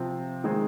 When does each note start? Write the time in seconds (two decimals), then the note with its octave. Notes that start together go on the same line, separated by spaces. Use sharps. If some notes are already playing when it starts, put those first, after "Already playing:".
Already playing: C3 F3 C4
0.44 D#3 G#3 C4 G#4 C5